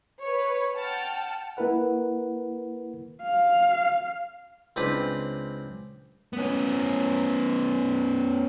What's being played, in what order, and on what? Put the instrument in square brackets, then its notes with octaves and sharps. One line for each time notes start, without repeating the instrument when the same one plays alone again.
[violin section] B4 C#5
F#5 G5 A5 F6
[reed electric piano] A#3 E4 A#4 B4 F#5
[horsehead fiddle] F5
[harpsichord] C#2 C4 D4 B4
[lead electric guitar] B3 C#4